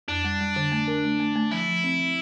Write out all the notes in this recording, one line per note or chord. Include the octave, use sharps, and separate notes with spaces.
F2 D4
G3
G3
D3
A3
A#4
A3
A3
A3
F3 E4
F3
C4
F3